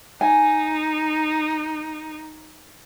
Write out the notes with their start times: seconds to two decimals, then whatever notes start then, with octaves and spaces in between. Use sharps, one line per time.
0.21 D#4 G#5